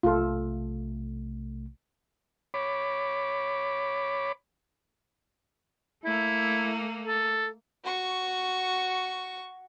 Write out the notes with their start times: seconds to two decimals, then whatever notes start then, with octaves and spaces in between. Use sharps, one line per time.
0.03 B1 C3 A3 F4 A4
2.54 C#5 B5 D6
6.05 A3 A#3 E4
7.07 A4
7.84 F#4 C#6